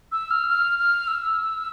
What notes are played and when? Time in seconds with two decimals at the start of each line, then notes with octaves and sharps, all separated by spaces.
0.12 E6
0.31 F6
0.50 F6
0.79 F6
1.07 E6